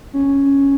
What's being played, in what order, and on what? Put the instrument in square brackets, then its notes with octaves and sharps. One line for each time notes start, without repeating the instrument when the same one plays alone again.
[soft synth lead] C#4